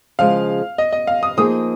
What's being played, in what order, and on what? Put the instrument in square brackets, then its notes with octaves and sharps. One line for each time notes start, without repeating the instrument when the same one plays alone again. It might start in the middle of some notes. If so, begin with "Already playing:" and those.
[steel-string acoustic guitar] C#3 F3 G#3 [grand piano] F5
[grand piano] D#5
D#5
F5
D#6
[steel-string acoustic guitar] F3 A#3 D#4 G#4 [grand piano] D#6